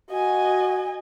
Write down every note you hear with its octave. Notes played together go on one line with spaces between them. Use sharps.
F#4 D#5 G#5